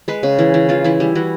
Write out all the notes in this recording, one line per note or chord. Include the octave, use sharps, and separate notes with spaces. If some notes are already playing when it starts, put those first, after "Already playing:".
G#3 B4
C#3
E3
E3
E3 F4
E3 E4
G3
E3 F#4